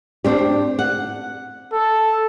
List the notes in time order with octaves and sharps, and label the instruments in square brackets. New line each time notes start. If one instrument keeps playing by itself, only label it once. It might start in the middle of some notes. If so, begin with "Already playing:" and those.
[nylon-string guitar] C4 D4 G4
F#5
[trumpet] A4